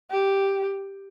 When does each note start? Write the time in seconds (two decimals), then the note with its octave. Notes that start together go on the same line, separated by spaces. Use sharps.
0.11 G4